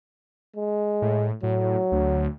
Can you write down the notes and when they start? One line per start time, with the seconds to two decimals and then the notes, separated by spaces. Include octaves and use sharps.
0.56 G#3
1.02 A2
1.43 A2 F#3
1.92 D2